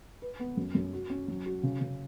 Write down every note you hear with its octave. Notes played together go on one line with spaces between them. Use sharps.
B4
B3
F#2
F#2
F#4
C#4
F#3
F#4
C#3
C#3